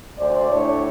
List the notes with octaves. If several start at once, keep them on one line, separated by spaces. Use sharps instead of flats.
D2 C5 D5
A2 D4 C#5